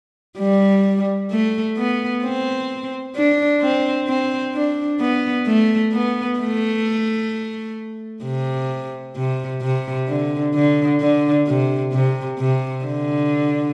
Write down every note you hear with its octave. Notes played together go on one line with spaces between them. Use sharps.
G3
A3
B3
C4
D4
C4
C4
D4
B3
A3
B3
A3
C3
C3
C3
D3
D3
D3
C3
C3
C3
D3